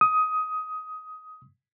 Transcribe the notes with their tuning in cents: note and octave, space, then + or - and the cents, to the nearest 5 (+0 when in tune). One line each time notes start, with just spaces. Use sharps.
D#6 +15